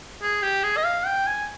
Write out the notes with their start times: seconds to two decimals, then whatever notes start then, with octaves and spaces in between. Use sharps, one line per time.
0.22 G#4
0.42 G4
0.63 G#4
0.77 D#5
0.85 F5
1.06 G5
1.27 G#5